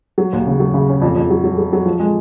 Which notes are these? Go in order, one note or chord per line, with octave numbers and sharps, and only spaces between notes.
F#3
D#2
C#3
F#3
C#3
C#4
F2
F2
F#3
F#3
F#3
F#3
F3
G#3